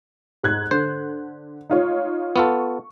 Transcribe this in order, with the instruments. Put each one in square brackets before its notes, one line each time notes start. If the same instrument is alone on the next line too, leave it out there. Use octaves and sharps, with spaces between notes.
[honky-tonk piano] G#2 F#6 G#6
[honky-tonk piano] D3 [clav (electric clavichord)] C5
[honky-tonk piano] D#4 F4 C#5
[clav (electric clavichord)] B3 F4 A4 [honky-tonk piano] C#6